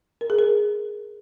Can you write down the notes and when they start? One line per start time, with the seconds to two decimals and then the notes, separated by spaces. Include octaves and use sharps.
0.21 A#4
0.30 G#4
0.38 A#4